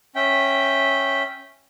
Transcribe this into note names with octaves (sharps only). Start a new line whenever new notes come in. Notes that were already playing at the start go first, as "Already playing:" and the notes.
C#4 E5 G5